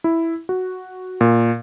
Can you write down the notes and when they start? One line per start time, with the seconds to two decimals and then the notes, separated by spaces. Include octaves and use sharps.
0.04 E4
0.49 F#4
1.21 A#2